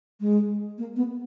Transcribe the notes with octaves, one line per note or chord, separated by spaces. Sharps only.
G#3
A#3
B3